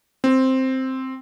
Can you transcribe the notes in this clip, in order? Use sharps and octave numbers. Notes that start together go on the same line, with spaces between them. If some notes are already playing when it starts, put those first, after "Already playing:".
C4